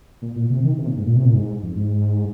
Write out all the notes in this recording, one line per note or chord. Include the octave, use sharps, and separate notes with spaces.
A#2
A#2
C3
D#3
C3
A#2
G#2
A#2
C3
A#2
G#2
F2
G#2